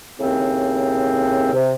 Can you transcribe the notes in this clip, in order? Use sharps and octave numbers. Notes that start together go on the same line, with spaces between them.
D#2 A2 C#3 C4
C3